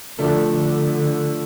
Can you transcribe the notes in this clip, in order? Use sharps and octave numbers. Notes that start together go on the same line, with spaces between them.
D3 F3 A3 D4 A4
D3